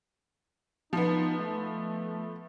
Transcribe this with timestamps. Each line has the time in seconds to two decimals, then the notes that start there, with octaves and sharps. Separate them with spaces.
0.93 F3 B3 D#4
1.38 A3